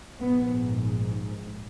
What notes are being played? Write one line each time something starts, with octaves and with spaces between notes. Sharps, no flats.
A#1 G#2 B3